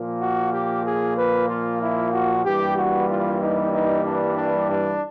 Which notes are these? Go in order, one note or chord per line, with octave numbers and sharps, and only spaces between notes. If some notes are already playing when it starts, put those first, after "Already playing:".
Already playing: A#2 F3 A#3
F#4
G4
G#4
B4
F4
E4
F#4
G2 E3 G3 A#3 G4
F#4
F4
D#4
D#4
D4
D4
D4